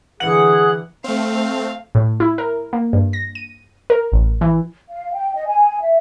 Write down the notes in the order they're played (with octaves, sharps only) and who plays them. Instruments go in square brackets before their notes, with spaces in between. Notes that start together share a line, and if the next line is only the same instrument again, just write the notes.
[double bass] D3 E3 [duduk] G#4 [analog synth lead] F#5
[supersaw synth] A3 C4 [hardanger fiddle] F5
[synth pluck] A2
E4
A#4
A#3
G2
A#6
D#7
A#4
A1
E3
[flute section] F5
G5
D#5
G#5
E5